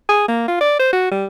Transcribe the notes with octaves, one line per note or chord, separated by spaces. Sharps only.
G#4
A#3
F4
D5
C5
F#4
G3